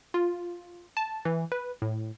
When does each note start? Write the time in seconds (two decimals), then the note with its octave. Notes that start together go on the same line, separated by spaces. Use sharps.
0.14 F4
0.97 A5
1.25 E3
1.52 B4
1.82 A2